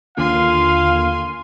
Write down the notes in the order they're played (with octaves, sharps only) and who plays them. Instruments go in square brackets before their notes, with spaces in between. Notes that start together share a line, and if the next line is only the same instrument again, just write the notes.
[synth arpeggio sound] D#2 D3 A#3 [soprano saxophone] F4 [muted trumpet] F5 [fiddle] G#5 C6